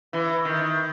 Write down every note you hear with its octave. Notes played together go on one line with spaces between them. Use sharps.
E3
D#3